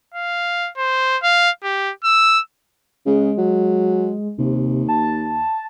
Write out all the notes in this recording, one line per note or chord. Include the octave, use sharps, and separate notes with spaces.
F5
C5
F5
G4
E6
C#3 G#3
F#3
D#2 C3
A5